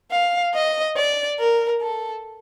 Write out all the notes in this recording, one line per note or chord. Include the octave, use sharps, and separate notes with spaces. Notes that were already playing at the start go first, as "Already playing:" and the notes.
F5
D#5
D5
A#4
A4